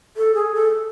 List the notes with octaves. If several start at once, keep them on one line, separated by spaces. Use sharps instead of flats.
A4
G#4
A4